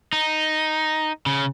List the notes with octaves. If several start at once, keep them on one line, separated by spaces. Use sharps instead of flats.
D#4
C#3